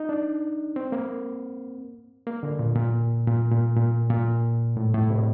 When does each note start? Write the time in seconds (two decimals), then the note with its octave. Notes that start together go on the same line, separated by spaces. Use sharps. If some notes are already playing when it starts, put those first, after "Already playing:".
Already playing: D#4
0.09 D4
0.76 C4
0.92 A#3
2.27 A#3
2.43 D3
2.59 A#2
2.76 A#2
3.27 A#2
3.51 A#2
3.76 A#2
4.10 A#2
4.77 A2
4.94 A2
5.10 C3